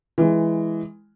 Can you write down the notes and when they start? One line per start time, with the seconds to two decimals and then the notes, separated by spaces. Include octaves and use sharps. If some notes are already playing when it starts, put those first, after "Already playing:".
0.18 E3 G#3